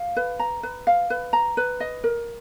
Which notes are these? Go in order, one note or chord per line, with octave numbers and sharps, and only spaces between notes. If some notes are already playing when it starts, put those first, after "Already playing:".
Already playing: F5
B4
A#5
B4
F5
B4
A#5
B4
D#5
A#4